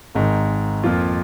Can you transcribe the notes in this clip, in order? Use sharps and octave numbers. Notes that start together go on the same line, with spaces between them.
G#1 G#2 D#3
F2 F3 A#3 F4